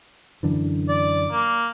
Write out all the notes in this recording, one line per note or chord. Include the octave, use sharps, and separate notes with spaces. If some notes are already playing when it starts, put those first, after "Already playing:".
F#2 D3 E3
D5
A#3